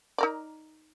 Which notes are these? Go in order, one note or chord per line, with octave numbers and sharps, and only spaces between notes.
D#4 A#4 D5